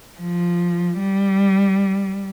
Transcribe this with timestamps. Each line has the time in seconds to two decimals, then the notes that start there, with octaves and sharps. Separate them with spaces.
0.19 F3
0.99 G3